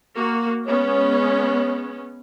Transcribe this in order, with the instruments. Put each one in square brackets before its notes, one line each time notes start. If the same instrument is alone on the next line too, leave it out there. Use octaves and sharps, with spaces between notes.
[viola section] A#3 F#4
[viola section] G#3 B3 C#4 [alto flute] C#5